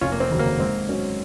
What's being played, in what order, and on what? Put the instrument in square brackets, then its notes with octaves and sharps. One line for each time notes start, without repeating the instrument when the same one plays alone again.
[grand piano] F1 [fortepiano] C#4 F4
[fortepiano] A#3
C4
[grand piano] D#2 C#3 F#3
[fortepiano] A#3
[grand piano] G#2 [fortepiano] C4
[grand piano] F#3 C#4